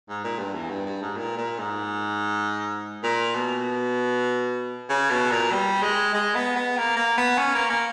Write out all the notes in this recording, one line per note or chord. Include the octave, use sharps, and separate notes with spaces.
G#2
A#2
G2
E2
G2
G2
G#2
A#2
A#2
G#2
A#2
B2
C#3
B2
A#2
G3
G#3
G#3
B3
B3
A#3
A#3
B3
C#4
A#3
A#3